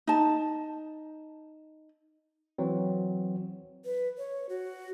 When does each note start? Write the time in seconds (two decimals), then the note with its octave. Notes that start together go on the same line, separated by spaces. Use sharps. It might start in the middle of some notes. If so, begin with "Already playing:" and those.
0.07 D#4 A5
2.58 E3 F#3 C4
3.85 B4
4.18 C#5
4.49 F#4